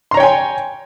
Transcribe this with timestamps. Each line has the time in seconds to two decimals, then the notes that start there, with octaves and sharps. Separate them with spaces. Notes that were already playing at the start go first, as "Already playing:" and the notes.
0.11 C6
0.14 A#5
0.17 C#5
0.20 G5
0.23 G#5